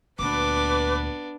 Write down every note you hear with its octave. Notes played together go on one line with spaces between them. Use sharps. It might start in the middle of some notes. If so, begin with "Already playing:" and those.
D2 A#2 B3 D4 B4 D6